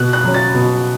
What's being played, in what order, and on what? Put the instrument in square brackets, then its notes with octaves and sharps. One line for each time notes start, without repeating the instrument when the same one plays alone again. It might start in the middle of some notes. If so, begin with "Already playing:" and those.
Already playing: [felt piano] B2 F#6
F#6
F#3 C#4
A6
B2